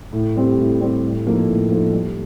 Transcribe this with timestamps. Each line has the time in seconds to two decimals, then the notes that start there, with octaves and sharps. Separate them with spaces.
0.13 A2
0.36 G3 C4 G4
0.58 A2
0.80 G3 C4 G4
1.03 A2
1.25 F3 A#3 D#4 A4
1.48 A2
1.70 F3 A#3 D#4 A4
1.92 G3